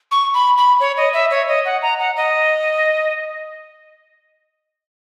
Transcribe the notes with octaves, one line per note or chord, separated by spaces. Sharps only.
C#6
B5
B5
C#5
D#5
E5
C#5
D#5
F#5
A#5
F#5
D#5